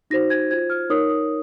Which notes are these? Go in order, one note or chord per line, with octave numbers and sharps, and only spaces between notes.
D#4 F#4 C5 A#6
G#6
F4 C5 G#6
F6
D#4 A#4 C#5 D#6
D#6